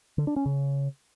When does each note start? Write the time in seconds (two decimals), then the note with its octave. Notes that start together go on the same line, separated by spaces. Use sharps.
0.18 D3
0.27 D4
0.36 C#4
0.46 C#3